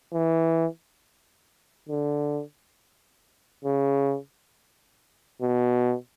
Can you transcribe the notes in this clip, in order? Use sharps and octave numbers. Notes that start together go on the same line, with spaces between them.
E3
D3
C#3
B2